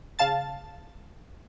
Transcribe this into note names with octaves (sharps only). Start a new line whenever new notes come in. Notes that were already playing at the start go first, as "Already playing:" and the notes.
C#3 F5 A5 A6